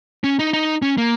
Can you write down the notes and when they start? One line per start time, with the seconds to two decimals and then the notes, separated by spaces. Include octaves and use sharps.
0.24 C#4
0.39 D#4
0.53 D#4
0.82 C#4
0.98 A#3